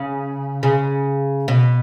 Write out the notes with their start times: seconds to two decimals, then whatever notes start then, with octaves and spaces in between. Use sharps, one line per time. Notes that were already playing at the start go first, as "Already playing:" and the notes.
Already playing: C#3
0.63 C#3
1.48 B2